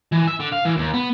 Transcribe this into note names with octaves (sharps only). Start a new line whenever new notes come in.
E3
E5
D3
F5
E3
D#2
B3